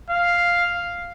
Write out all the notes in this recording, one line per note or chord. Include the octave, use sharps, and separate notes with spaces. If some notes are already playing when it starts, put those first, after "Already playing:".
F5